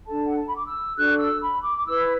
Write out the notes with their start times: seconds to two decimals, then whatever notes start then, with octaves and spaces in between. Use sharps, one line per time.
0.06 D4 A4 A5
0.25 F#5
0.36 A5
0.46 B5
0.56 D6
0.66 E6
0.95 D4 F#4 A4 F#6
1.18 E6
1.41 B5
1.63 D6
1.78 D6
1.86 E4 B4 E6